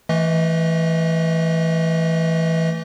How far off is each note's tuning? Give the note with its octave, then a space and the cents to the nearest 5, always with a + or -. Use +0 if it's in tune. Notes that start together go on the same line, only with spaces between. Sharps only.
E3 +0 A3 +5 D#5 +35